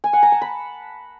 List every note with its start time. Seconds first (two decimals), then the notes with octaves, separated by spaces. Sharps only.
0.04 G#5
0.13 F#5
0.23 A#5
0.32 A5
0.41 B5